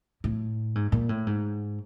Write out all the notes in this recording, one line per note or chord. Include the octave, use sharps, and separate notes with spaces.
A2
G#2
A#2
A2
G#2